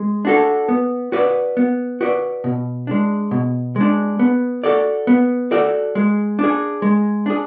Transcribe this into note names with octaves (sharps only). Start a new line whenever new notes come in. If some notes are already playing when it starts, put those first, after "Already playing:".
Already playing: G#3
D4 F#4 A4
B3
F#4 B4 D5
B3
F#4 B4 D5
B2
G#3 D4
B2
G#3 D4
B3
F#4 A4 D5
B3
F#4 A4 D5
G#3
D4 G#4
G#3
D4 G#4